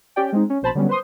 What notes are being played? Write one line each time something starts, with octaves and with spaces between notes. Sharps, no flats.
C#4 G4 D5 G5
G#3 C4 D#4
C#4
A#1 B2 C5 A5 B5
D3 F#3 G3 B3 C#4
B4 C5 C6 D#6